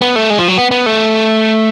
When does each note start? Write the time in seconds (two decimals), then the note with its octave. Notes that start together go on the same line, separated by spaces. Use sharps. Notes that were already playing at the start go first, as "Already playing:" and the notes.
0.02 B3
0.16 A3
0.30 G#3
0.38 F3
0.48 F#3
0.58 B3
0.71 B3
0.86 A3